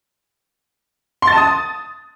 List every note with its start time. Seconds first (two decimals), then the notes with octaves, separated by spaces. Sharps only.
1.22 C6
1.27 A6
1.32 A5
1.37 D#6